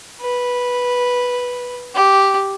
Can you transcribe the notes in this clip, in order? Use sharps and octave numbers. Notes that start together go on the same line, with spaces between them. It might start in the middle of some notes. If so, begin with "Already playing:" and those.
B4
G4